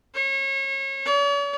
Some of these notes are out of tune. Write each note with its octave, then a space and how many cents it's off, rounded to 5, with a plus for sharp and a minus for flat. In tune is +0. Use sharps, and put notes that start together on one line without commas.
C#5 -35
C#5 +45